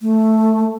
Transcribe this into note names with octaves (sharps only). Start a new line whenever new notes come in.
A3